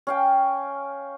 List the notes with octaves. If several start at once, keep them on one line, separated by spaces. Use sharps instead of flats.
C#4 F5 G5